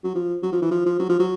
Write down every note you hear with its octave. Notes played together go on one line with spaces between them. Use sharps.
F#3
F3
F#3
F3
E3
F3
F3
F#3
F3
F#3